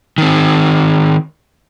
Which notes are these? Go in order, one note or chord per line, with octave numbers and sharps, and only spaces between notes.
D#3 C4